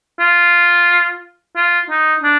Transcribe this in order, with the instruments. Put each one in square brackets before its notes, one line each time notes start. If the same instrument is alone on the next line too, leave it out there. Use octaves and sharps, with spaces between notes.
[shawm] F4
F4
D#4
D4